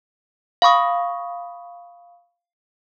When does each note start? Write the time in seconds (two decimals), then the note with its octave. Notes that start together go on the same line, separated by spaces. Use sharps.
0.62 F5 B5 C#6 D#6